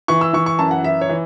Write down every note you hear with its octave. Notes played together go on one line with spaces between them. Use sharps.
E3 C#6
E6
E3 C#6
C#6
F#2 A5
F#5
E3 E5
C#5
E3